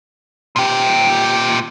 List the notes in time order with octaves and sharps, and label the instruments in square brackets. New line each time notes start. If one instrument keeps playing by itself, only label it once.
[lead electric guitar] A#2 G4